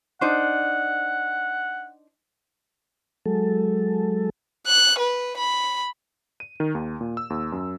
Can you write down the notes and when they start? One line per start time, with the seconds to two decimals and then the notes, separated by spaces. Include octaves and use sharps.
0.21 D4 D#4 C5 F#5
3.26 F#3 G#3 A4
4.67 F#6
4.99 B4
5.38 B5
6.40 D#7
6.60 D#3
6.75 D#2
7.01 A#2
7.17 E6
7.30 D#2
7.52 F#2